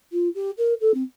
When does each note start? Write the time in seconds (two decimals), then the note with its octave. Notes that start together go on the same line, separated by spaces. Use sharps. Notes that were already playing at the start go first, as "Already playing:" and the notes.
0.12 F4
0.35 G4
0.58 A#4
0.81 A4
0.94 C4